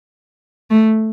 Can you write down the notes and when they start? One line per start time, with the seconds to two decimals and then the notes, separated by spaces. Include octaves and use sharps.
0.71 A3